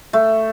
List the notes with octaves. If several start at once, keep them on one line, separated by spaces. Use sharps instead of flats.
A3